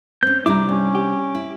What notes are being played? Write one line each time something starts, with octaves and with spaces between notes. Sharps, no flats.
C4 C#4 G6
C3 G3 D4 E4 A#5 D6
G2 C#4
G4
E4